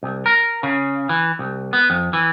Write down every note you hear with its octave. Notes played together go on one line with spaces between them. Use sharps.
C2
A#4
C#3
E3
C2
B3
F2
E3